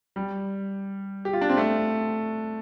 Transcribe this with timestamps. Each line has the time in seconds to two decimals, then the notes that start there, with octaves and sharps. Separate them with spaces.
0.16 G3
1.25 G4
1.33 F4
1.41 D4
1.49 C4
1.57 A3